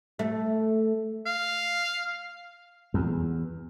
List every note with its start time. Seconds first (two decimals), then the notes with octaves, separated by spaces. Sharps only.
0.19 A3
1.26 F5
2.94 E2